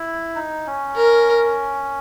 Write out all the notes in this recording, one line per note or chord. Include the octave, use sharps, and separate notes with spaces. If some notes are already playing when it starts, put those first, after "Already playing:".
Already playing: E4
D#4
C#4
A#4